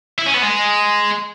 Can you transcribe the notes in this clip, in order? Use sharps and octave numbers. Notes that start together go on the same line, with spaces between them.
E4
C#4
B3
G#3